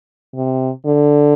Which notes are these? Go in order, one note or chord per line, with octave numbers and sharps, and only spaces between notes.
C3
D3